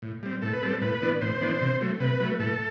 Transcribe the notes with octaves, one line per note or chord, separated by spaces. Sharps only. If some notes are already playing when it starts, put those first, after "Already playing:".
A2
G3 C4
A2 A4
B4
G3 C4 A4
A2 B4
E3 B3 D4
A2 C5
E3 B3 D4
C3
F#3 A3
C3 B4
F#3 A3
A2 A4